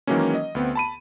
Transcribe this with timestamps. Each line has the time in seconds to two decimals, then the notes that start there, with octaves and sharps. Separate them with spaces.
0.07 D#3 E3 F#3 G#3 A#3 C#4
0.35 D#5
0.55 D2 B3 C4
0.75 A5 B5 D#7